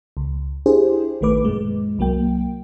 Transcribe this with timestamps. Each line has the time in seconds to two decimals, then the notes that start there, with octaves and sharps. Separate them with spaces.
0.17 C#2
0.66 D4 E4 G4 G#4 C5
1.21 A1 D#3 A3 B4 D6
1.45 F#2 A#2 G#3
1.99 C2 F#3 A#3 G5